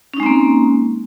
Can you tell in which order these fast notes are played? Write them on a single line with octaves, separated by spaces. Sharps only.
C#4 D#4 G#3 C4 A#3